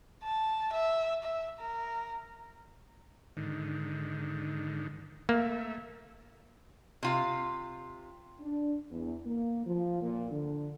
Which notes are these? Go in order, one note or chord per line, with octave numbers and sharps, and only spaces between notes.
A5
E5
E5
A#4
G#2 D3 D#3
A3 A#3 E5
C3 F4
D4
E2
A#3
F3
A#2
D3